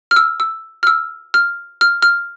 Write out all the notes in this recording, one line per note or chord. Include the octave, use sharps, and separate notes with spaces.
F6
E6
E6
F6
E6
F6
F6
F6